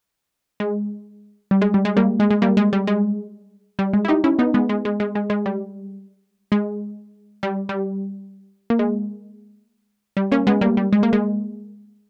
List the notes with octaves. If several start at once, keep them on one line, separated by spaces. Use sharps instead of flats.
G#3
G3
G#3
G3
G#3
G3 A#3
G#3
G#3
G3 A#3
G#3
G3
G#3
G3
G#3
E4
D#4 G4
C#4 E4
B3 D#4
G#3 B3
G#3
G#3
G#3
G#3
G#3
G3
G#3
G3
G3
A#3
G#3
G3
A#3 C#4
G#3 B3
G3 A#3
G3
G#3
A#3
G#3